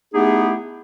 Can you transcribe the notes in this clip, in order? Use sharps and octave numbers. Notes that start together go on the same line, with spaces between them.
A3 B3 D#4 E4 G4 G#4